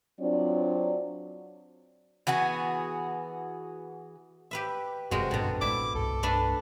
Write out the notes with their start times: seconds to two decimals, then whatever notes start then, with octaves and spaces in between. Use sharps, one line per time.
0.20 F#3 C4 D4 F4 C#5 D5
2.27 E3 B3 F#4 G#4
4.51 G4 B4 E5
5.11 F1 G2 C3 G#3 B3 F#4 A#4
5.31 A1 F#2 B2 D3
5.61 A1 G#3 E4 E5 D6
5.95 C2 G2 A4
6.23 A3 D4 B4